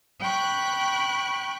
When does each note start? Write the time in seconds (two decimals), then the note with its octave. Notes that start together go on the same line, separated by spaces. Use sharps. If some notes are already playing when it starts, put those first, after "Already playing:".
0.20 G5 B5 C#6 F#6